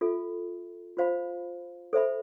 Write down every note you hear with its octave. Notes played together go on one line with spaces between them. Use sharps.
F4 A4 E5
F4 C5 F5 B5
A4 C5 E5 B5